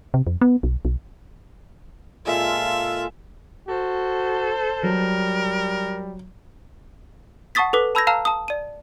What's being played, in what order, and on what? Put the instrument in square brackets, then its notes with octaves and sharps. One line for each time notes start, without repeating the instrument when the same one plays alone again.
[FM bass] C3
F2
B3
B1
B1
[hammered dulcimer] A#2 [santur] G#3 [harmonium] F4 A4 F5 [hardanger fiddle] E5
[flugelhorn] F#4 [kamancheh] A4 C5
[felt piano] F#3 [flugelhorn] G3 [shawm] A#4
[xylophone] F#5 A5 C#6 D#6 A6 B6
A4 B4 D6 B6
A5 B5 E6 G6 G#6 A#6
F5 A5 A#5 E6 F6
A5 D#6
D5 D#7